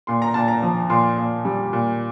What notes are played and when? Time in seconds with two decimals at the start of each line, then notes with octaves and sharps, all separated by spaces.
0.07 A#2 C6
0.22 A#5
0.34 A#2 A5
0.48 A#5
0.62 F3
0.90 A#2 C6
1.18 A#2
1.45 G3
1.73 A#2